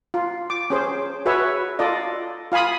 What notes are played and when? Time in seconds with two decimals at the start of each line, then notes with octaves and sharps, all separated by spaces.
0.14 F4
0.50 D6
0.70 C#4 G#4 C5
1.26 F#4 G#4 B4 C#5 E5
1.79 F4 A4 D5 D#5
2.52 F4 F5 G#5 B5 D#6